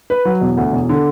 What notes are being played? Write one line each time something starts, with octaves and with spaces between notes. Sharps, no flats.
B4
F#3
E1
D2
E1
D3